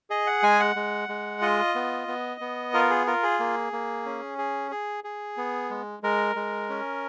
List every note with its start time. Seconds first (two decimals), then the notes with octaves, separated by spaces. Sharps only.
0.10 G#4 D#5
0.27 F#5
0.43 G#3 G#5
0.60 F#5
0.76 G#3
1.09 G#3
1.41 F4 D#5
1.75 B3
2.08 B3
2.41 B3
2.74 F4 A#4
2.90 G#4
3.07 F4 A#4
3.23 G#4
3.40 A#3
3.73 A#3
4.05 C#4
4.38 G#4
4.71 G#4
5.04 G#4
5.37 B3
5.70 G#3
6.03 G#3 A#4
6.36 G#3
6.70 C#4